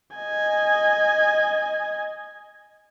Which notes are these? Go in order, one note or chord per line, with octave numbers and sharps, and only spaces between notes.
D#5 G#5